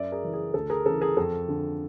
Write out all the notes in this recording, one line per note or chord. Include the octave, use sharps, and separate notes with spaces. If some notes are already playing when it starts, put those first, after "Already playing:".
Already playing: F#2 D5 E5
G#4 A#4
C#3 E3
G#4
D2 A4
G#4 A#4
C#3 E3 A4
G#4 A#4
F2 A4
D3